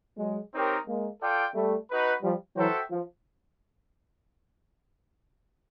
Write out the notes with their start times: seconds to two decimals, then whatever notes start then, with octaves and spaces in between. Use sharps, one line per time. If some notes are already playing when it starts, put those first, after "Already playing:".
0.18 F#3 G#3
0.53 C4 D#4 G4 A#4 C#5
0.86 G#3 A#3
1.20 F4 A4 D5 G5
1.55 G3 A3
1.89 D#4 F#4 B4
2.23 F3 G3
2.56 E3 F#3 F#4 A4 C5 E5 G5
2.91 F3